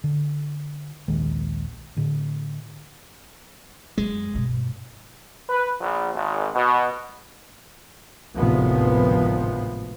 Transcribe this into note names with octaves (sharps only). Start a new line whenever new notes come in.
D3
A#1 D#2 D#3 G#3
A2 D3
F#2 G#3
G2 B2
B4
A#1
G#1
B2
G#1 D2 A2 C3 F3 B3